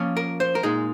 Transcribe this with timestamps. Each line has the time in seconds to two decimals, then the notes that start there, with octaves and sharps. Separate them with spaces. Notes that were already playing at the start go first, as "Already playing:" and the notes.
Already playing: F3 A#3 C#4 F4
0.17 A#4
0.40 C5
0.55 A#4
0.63 A#2 G#3 D#4 G#4